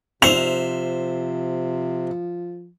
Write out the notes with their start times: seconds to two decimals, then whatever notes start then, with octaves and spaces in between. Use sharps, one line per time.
0.22 C3 F3 C5 E5 F7